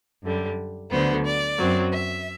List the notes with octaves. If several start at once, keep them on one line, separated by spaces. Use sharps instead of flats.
F#2 D3 G3
D2 D3 F#3 B3 C5
D5
F#2 F#3 C4
E5